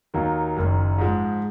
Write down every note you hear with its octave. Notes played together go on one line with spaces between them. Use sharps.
D#2 D#3 F#3 A#3 D#4
F#1 F#2 D#3
G#2 F3 G#3